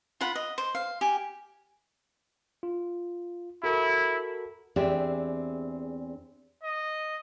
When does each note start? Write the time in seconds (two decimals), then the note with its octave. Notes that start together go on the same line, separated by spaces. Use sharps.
0.21 F4 F#5 B5
0.35 D#5
0.58 C5
0.75 F5
1.01 G4 G#5
2.63 F4
3.64 E4 F#4 A4 A#4
4.76 E2 C4 D4 G4 G#4 E5
6.63 D#5